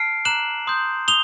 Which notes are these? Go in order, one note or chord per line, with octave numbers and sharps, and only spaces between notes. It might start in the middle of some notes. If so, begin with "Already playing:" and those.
Already playing: A5 F6 C7 D7
A#5 D6 F#6 E7 F#7
C6 D#6 G6
D#6 F7 G7